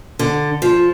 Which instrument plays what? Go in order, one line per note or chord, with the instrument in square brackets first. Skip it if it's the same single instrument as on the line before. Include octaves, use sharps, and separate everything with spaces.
[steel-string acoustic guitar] D3
F3